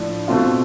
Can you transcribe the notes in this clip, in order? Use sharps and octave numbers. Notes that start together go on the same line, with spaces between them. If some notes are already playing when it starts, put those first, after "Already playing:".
Already playing: A2 F3 A3 D4
B2 A3 C4 F4